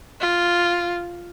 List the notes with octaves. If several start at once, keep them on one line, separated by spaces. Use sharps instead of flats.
F4